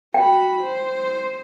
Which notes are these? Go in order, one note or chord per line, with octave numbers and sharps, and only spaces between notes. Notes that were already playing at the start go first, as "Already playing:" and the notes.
F#4 G5 B5
C5